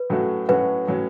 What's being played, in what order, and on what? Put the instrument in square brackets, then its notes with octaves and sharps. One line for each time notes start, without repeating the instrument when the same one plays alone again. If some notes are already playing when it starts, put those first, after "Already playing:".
Already playing: [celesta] B4
[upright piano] A2 F#3 A3 C#4 F#4
[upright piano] A2 F#3 A3 C#4 F#4 [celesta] B4
[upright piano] A2 F#3 C#4